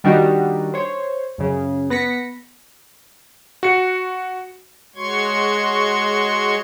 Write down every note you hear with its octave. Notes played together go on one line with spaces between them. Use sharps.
D#3 G3 D4 D#4 F#4 G4
C5 C#5
F#2 C#3
B3 A#6 B6 C#7
F#4 C#7
G#3 F#4 C#5 C6 C#6 G#6